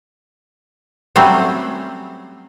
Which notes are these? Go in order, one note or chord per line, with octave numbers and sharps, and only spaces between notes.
F#3 G3 A3 C4 C#4 C5